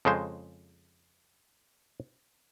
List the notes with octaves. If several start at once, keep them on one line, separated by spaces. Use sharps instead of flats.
F2 C#3 G#3 C5